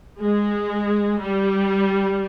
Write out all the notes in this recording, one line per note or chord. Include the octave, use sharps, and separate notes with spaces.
G#3
G3